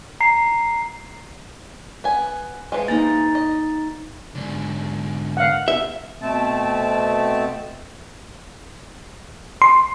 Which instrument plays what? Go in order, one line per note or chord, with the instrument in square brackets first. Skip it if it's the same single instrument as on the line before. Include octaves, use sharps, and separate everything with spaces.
[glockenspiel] A#5 C7
[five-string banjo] B3 G#5
E3 F3 G#3
[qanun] A#3 D#4 [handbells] A6
[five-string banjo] D#5
[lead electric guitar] G#2 D3
[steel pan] F5 F#5
[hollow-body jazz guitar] E5
[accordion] B2 A3 C4 A5
[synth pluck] C6